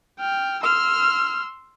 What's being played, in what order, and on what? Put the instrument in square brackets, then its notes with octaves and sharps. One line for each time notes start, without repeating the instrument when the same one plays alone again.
[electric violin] G5 F6
[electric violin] C6 E6 [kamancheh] F6